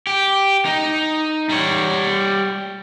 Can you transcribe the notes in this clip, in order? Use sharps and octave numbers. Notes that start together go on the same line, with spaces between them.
G4
D#4
G3 C#5